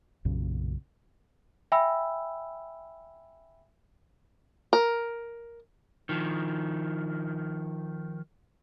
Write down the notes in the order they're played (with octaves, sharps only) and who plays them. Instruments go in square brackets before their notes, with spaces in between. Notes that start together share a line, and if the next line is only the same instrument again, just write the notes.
[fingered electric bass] B1 F#2 A#2 C#3
[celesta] E5 G5 G#5 B5 E6
[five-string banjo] A#4
[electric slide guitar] D#3 F3